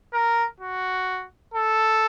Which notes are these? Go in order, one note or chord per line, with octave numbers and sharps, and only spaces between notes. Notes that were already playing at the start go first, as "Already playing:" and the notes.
A#4
F#4
A4